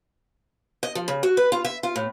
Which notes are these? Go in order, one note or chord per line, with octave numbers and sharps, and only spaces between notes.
D#5
F3
C#3
F#4
B4
F4
E5
F4
A2